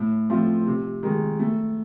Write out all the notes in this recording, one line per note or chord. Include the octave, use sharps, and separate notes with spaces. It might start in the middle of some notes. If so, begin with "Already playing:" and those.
Already playing: A2
F3 A3 C4 F4
C3
D#3 G#3
A3